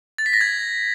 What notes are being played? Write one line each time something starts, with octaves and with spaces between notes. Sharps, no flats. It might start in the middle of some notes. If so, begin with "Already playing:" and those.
A6
B6
A#6
G#6